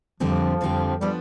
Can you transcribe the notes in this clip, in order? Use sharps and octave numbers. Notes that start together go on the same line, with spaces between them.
F2 D3 F3 G3 C4 G4
F2 D3 G3 C4 G4
F3 G3 B3 D4